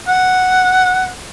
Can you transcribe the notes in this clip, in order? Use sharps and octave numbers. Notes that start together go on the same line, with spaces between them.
F#5